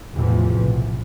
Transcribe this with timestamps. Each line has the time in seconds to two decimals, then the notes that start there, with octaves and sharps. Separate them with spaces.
0.14 F1 E2 A2 C3 E3 F3
0.55 B1